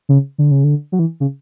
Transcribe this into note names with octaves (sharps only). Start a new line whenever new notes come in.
C#3
D3
C#3
D3
F#3
E3
C#3